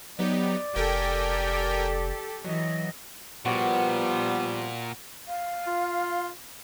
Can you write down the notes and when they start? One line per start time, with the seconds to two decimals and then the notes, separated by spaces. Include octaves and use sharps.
0.19 F#3 B3 D#4 G4 D5
0.76 F1 G4 A4 A#4 G5 G#5
2.44 E3 F#3 D#5
3.45 A#2 F3 G3 B3 F#4 D5 F#5
5.28 F5
5.67 F4